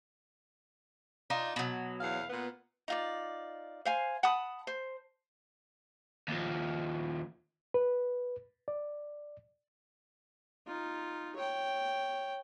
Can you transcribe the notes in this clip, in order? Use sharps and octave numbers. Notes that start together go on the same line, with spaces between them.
D4 D#4 F4
B2 F#3
E2 F5
A#2 B3
D#4 F4 D5
C5 F5 G#5
F#5 A5 B5 D#6
C5
D#2 F3
B4
D5
D#4 F4
C#5 G5